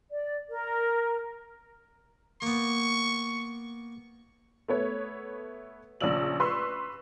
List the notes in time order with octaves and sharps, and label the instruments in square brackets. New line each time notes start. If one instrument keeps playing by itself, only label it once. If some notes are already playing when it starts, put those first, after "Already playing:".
[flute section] D5
A#4
[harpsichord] A#3 B3 [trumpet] C#6
[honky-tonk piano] A3 B3 C#5
A#1 C#3 D5 E6 F#7
B4 C6 C#6 E6